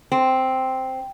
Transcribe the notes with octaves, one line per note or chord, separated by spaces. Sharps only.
C4